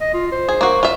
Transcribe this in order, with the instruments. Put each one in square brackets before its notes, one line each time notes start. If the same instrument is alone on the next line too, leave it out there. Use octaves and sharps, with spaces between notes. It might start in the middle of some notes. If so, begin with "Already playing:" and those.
[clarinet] D#5
F4
C5
[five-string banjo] G#4
A#3 F#4
F4 E5